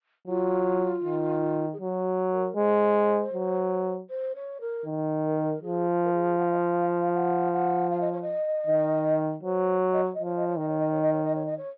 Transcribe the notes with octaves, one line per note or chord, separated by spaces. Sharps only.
F#3 F4
D#3
G#4
F#3 F#4
A#4
G#3 C5
F#3
C5
C#5
A#4
D#3
A#4
F3 G#4
A#4
G#4
F#5
F5
D#5
F5
F#5
F#5
F5
D#5
C#5
D#5
D#3
F#3 C5
C#5
D#5
C#5
D#5
F3
C#5
D#5
C#5
D#3 D#5
C#5
D#5
C#5
D#5
C#5
D#5
C#5
D#5
C#5